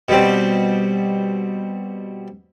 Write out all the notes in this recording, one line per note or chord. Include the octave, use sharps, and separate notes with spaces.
B2 G3 C4